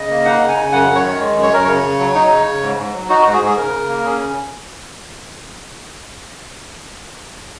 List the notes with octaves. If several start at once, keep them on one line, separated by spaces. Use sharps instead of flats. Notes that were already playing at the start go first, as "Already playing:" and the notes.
Already playing: C#3 D#5
A#3
D#4 F#5
C#3
G#5
C#3
F#2 F#5
F#2
C#5
D#3
G#3
F#2
C#5
F#2 A#4
C#3 C#5
C#3
F#3
D#4
C#3
C#3
G#2
G#2
F#3
D#4 F#4
G#2 F#4
G#4
G#2
G#4
C#3 A#4
C#3
A#3
C#4 G#4
C#3